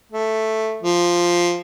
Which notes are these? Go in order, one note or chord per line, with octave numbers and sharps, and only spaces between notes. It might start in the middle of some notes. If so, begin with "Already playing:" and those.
A3
F3